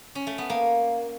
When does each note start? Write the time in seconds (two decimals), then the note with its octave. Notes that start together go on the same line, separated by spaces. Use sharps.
0.15 C#4
0.27 A3
0.38 B3
0.50 A#3